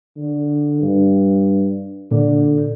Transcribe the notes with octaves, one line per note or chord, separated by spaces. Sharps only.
D3
G2
A#2 D3